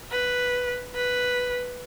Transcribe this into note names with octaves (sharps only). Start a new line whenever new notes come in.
B4
B4